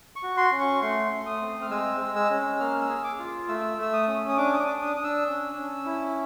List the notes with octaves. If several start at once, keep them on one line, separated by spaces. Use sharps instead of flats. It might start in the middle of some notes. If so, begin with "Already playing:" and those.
C#6
F#4
C6
C#4
C#6
A3 C6
A3
D#6
C4
F6
G#3 E6
G#3
E6
C#4
A#3 F6
E6
G#4
D6
F4
A3 E6
A3 E6
D#6
C#4
D#6
D4 D6
D#6
D6
D4
D#6
D4 D#6
E6
C#4
C#4
E4